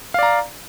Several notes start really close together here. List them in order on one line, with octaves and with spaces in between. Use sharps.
F5 D5 A#5